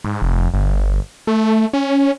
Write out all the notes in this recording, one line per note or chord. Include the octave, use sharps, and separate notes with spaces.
G#2
F1
G1
A3
C#4